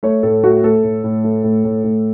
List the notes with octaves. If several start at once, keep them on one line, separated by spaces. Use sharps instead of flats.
A3 C#5
A2 A4
A3 F#4
A3 A4
A2
A2
A3
A2
A2
A2